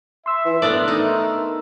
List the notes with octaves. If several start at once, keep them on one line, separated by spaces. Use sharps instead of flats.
E5 C6 E6
E3
A3 B3 D4 A#4 D5
D#4